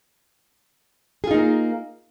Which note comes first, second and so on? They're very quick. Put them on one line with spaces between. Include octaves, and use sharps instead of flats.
G#4 F4 D#4 A#3